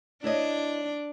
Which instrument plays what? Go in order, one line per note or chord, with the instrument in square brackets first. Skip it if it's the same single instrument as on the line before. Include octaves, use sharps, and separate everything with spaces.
[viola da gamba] D4 [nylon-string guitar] E4 C#5 D#5